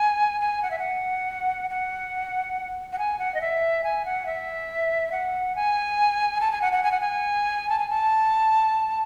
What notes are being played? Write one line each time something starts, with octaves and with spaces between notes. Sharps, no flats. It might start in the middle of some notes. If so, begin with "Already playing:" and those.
Already playing: G#5
G#5
F#5
E5
F#5
F#5
F#5
G#5
F#5
D#5
E5
G#5
F#5
E5
F#5
G#5
A5
G#5
F#5
F#5
G#5
F#5
G#5
A5
G#5
A5